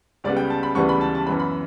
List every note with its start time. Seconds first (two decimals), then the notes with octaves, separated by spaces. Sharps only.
0.24 C#2 C#3 G3 B3 D5
0.36 G5
0.50 A5
0.63 B5
0.75 D2 C#3 E3 G3 B3 C#6
0.89 B5
1.01 A5
1.15 A5
1.26 F#2 E3 B3 B5
1.39 B5